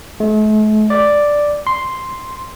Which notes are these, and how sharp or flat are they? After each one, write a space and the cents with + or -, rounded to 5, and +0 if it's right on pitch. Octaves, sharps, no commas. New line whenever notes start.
A3 -45
D5 +0
C6 +0